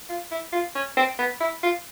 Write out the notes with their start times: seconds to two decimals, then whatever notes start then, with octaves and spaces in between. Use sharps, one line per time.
0.09 F4
0.31 E4
0.53 F4
0.75 C#4
0.97 C4
1.19 B3
1.41 E4
1.63 F4